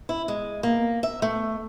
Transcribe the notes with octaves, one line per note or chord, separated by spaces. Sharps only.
E4
G#3
A#3
E5
A3